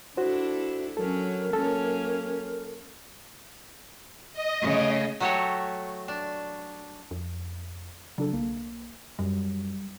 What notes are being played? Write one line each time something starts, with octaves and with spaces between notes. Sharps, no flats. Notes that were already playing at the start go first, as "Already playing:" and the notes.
D4 E4 F#4 A4 C5
F#3 C#4 A4 A#4
F#3 A#3 C#4 A4
D#5
C#3 A3
F#3 A3 F#4 G4 A4 C#5
D4
F2
C#3 F#3 D4 A4
B1 A#3
F#2 G3